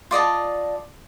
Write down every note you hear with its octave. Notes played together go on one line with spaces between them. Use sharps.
F4 D5 D#5 A5